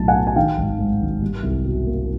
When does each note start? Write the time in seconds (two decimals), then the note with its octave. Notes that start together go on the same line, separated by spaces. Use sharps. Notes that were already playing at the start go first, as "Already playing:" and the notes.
Already playing: B1 A2 F#3 A5
0.08 F#5 G#5
0.15 B3
0.27 G#5
0.36 D#3 F5 G5
0.58 G#1
0.79 G#2
1.01 G#1
1.22 G3
1.43 C2
1.64 B2
1.86 A#3